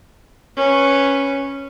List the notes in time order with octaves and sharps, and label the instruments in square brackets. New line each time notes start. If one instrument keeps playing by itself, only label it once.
[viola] C#4 B4